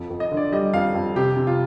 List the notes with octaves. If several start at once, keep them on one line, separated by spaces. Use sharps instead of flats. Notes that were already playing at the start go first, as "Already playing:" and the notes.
Already playing: F2
F2
D#5
D3
D5
G3 D#5
F2 F5
F2
C3 G4
C3
F4